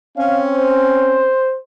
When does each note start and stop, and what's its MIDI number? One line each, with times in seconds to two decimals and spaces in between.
0.17 1.32 60
0.17 1.32 61
0.17 0.40 77
0.53 1.57 72